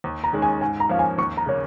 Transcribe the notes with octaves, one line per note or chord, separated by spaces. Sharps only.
D#2
A#5
D#3 G#3 C#4
G#5
G#2 G#5
A#5
F3 A#3 C#4 F5
G#5
D#2 C#6
A#5
C#3 A#3 C#4 C#5